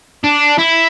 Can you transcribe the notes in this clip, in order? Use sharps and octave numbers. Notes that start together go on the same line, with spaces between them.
D4
E4